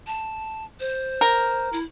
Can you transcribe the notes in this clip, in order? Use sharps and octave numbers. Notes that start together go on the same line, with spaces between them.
A5
C5
A#4
E4